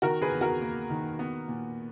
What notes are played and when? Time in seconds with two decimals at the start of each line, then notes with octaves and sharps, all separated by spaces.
0.02 D#3 F#4 A#4
0.22 G#4 B4
0.31 E2
0.41 F#4 A#4
0.61 A#3
0.90 D#3
1.19 B3
1.48 A#2